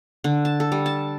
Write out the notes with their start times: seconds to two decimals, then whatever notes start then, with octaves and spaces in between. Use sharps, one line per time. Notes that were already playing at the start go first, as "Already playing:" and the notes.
0.24 D3
0.45 A5
0.60 A4
0.72 G3
0.86 A5